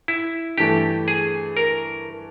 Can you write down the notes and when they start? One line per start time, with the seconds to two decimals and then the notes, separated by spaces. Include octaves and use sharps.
0.08 E4
0.57 G2 E3 A3 G4
1.08 G#4
1.57 A#4